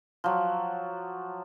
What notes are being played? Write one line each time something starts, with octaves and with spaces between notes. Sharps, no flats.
F3 F#3